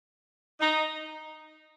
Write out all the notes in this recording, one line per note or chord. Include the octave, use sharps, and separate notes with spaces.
D#4